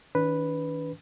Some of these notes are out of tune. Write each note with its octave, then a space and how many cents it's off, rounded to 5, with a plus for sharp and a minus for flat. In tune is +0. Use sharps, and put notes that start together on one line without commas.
D#3 +35 D4 -40 B4 +0